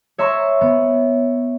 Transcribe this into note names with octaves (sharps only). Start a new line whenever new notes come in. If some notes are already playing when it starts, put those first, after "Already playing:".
C#5 E5 A#5 C6 C#6
B3